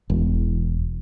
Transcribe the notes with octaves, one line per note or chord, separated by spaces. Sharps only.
E1